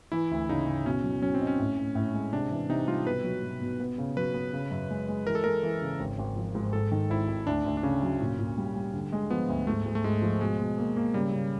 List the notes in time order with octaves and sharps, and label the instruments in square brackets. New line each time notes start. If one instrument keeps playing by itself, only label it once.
[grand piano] E3 [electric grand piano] E4
[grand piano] D2
[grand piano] C#3 [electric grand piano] D#4
[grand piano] C#3
[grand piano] B2 [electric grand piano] C#4
[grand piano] F#3
[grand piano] F#3 [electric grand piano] C#4
[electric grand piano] C4
[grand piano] D#4
[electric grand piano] C#4
[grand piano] A2
A2
A2
G#3
[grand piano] C3 [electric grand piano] D4
[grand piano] E3
[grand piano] C3 [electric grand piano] D#4
[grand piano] G3 [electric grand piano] F4
[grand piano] B2 [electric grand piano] B4
[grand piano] F#3
B2
B2
B3
C#3
[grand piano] F#3 [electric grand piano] B4
[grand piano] B3
C#3
F#2
G#3
G#3
[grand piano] E3 [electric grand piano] A#4
[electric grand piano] A4
[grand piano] G#3 [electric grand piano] A#4
[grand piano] E3
C#3
G#1
G#1
F3
G#2
[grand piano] G#2 [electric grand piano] A4
[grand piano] D#3
[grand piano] G#1 [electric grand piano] E4
[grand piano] G#1
[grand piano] D2 [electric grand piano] D4
[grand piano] D2
[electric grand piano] D4
[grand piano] C#3 [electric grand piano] C#4
[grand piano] F#3
A#2
A#2
G3
G3
D3
G#3
[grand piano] F3 [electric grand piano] B3
[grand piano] D2
[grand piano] G#2 [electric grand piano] A3
[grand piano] G#2
[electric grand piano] A3
[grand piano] G#2 [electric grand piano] G#3
[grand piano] F3
[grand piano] B2 [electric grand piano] G#3
[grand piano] B2
A#3
A#3
[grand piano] C#3 [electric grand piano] G3
[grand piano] C#3